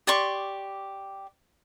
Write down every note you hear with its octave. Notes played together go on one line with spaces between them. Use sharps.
G4 D5 C6 C#6